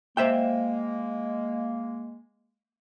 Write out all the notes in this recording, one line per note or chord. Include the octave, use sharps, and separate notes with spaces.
G#3 A#3 C5 E5 G5